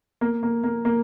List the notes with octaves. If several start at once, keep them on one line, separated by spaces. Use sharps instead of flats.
A#3
A#3
A#3
A#3